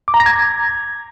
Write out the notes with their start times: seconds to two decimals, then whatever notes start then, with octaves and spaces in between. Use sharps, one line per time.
0.08 D6
0.14 A#5
0.20 A#6
0.26 G#6